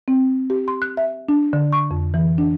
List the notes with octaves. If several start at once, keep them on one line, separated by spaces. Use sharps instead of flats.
C4
G4
C6
F#6
E5
D4
D3
C#6
F2
E3
D4